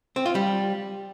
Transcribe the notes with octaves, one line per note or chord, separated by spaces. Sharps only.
C4
F4
G3